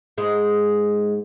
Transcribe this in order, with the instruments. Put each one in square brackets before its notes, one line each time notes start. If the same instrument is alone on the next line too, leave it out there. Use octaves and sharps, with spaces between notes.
[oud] G#2 G#3